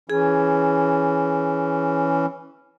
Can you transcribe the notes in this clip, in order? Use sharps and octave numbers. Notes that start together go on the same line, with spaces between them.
E3 C#4 G#4